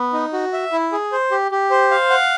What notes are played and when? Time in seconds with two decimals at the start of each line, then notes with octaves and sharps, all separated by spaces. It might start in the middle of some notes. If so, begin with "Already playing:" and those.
Already playing: B3
0.13 D#4
0.33 F#4
0.53 E5
0.72 E4
0.92 G#4
1.12 C5
1.31 G4
1.52 G4
1.70 C5
1.91 F5
2.10 F#5